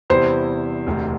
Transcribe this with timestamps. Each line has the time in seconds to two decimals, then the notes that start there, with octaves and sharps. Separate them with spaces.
0.10 E2 C3 G3 E4 C5
0.87 E1 D2 C3